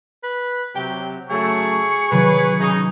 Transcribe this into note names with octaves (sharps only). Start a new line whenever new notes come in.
B4
C3 F#3 G4 G5
C#3 F#3 A3 G#4 C#6
C3 D#3 F#3 B4
C#3 D#4